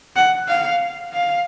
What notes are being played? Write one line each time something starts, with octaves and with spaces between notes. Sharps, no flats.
F#5
F5
F5